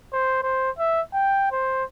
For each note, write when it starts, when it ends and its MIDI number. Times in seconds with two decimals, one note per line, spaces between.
0.13 0.41 72
0.43 0.71 72
0.78 1.01 76
1.13 1.48 79
1.51 1.84 72